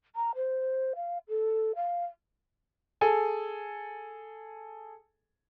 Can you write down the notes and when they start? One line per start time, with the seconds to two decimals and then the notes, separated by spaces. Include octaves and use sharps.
0.16 A#5
0.35 C5
0.96 F5
1.28 A4
1.76 F5
3.01 G#4 A4 G#5